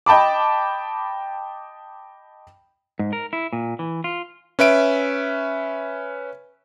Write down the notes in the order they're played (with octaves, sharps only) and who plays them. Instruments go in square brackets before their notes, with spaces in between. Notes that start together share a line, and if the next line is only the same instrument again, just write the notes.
[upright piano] D#5 G5 A5 B5 D6
[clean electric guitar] G#2
A#4
E4
A#2
E3
F4
[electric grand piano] C#4 B4 E5 D7